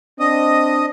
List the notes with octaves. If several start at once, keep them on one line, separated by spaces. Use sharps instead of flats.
C4 D4 D#5